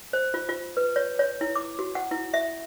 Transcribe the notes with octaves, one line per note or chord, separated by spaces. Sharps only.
C5
F4
F4
B4
C#5
C#5
E4
D6
F#4
F#5
E4
E5